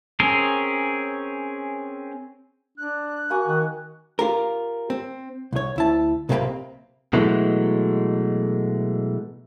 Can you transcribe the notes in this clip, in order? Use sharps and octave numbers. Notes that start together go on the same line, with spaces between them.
C4 C#4 G#4 A#4
D4 F#6
A#3 F#4 G#5
D#3
F4 G4 A#4
C4
C2 C#5
D2 E4 A5
B1 C3 A#3 G#4 G5 B5
B2 E3 F#3 G#3 A3